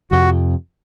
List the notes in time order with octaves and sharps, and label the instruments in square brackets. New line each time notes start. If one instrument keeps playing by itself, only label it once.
[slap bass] F2 C3 F3 [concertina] F#4